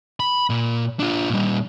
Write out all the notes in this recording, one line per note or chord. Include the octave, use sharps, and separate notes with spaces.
B5
A#2
D4 F4
A#2 G3